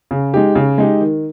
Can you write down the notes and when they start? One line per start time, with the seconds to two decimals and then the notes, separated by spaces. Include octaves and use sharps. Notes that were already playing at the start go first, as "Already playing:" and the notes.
0.11 C#3
0.34 G#3 D#4 G4
0.55 C#3
0.78 G#3 D#4 G4
1.01 D#3